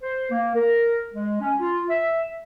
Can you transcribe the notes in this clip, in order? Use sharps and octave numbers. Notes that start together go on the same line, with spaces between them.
C5
A#3
A#4
G#3
C#4
F4
E5